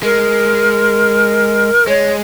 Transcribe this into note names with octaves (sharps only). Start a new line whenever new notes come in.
G#3 A#4
G#3 C#5